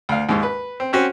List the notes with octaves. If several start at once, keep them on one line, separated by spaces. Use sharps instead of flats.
D2 F5
D#2 G#2
B4
C4
C4 C#4 F#4 C5